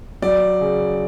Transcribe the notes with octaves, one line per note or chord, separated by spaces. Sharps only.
F#3 D5
C#3